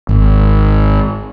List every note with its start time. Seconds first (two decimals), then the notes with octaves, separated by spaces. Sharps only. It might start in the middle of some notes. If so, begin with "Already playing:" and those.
0.09 G#1